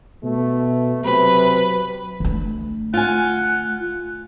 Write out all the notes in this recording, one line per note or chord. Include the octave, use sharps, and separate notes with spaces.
B2 A3
C3 F#3 B4
D3 A3
F4 F#5 G#5